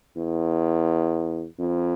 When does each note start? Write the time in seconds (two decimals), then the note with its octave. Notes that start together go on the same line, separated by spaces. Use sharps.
0.17 E2
1.59 F2